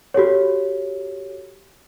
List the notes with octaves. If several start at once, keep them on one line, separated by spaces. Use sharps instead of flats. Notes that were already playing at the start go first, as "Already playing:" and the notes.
F#4 G4 A4 C#5